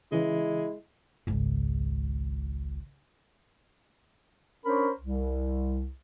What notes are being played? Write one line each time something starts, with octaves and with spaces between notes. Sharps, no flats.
C#3 E3 G#3 E4
G#1 C#2
C#4 D4 A#4 C5 C#5 B5
C2